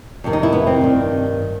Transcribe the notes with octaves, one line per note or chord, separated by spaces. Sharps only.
F2 C3 D#3
D#4
E4
B3
C4
G2 D#3